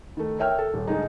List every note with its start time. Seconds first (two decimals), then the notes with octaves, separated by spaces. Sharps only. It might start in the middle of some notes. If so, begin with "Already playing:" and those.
0.17 D#3 A3
0.38 A#4 C#5 E5 G5 F6
0.59 A4
0.74 D#1
0.87 G#2 D3 G#3 D#4